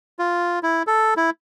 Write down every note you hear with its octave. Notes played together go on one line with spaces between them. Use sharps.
F4
E4
A4
E4